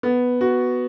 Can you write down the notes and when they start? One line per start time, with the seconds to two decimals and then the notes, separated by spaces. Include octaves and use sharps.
0.03 B3
0.41 F#4